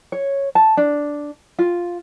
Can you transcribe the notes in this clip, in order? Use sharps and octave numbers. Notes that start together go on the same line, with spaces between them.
C#5
A5
D4
F4